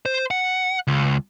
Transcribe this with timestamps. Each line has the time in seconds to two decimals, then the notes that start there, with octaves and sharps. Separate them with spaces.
0.06 C5
0.31 F#5
0.87 C#2